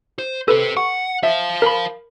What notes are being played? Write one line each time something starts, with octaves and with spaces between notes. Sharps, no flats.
C5
G4 A4 B4 C5
F#5 C#6
C5 E5 F5
A#4 B5